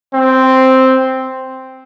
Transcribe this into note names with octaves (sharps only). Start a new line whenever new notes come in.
C4